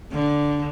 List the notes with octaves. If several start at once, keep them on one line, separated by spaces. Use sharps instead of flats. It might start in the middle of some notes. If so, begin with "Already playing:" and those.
D3